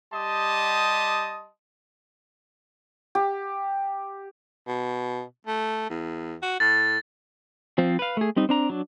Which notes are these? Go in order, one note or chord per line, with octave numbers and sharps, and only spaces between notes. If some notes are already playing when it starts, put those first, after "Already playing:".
G3 G4 D#5 A5 C6 D#6
G4
B2
A3
E2
F#4
A2 A6
F3 C4 F4
B4 F5
A3 G#4
G3 C4 D#4
C4 D4 A#5
F#3 D4